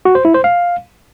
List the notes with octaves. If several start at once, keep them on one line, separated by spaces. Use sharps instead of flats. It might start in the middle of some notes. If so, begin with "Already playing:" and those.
F#4
C5
E4
C5
F5